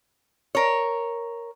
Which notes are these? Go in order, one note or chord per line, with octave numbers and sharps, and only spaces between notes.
A#4 C#5